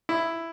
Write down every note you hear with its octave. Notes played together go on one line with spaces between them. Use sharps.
E4